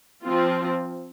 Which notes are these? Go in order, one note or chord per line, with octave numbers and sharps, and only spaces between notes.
F3 C4 F4